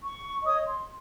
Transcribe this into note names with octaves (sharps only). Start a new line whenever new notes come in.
C#6
C#5 D#5 D#6
C6